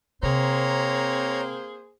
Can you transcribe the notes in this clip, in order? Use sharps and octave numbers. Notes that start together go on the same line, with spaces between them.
C3 A#3 C4 G#4 C5 C#5 A#5